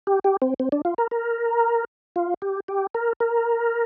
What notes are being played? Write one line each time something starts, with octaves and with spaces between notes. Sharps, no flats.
G4
G4
C4
C4
D4
F4
A#4
A#4
F4
G4
G4
A#4
A#4